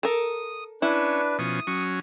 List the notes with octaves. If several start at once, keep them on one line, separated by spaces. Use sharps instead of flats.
A4 A#4 D#6
C#4 D4 E4 B4
B2 F3 C#4 D#6
F#3 C#4